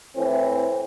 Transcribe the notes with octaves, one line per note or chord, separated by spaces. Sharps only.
A2 E3 C4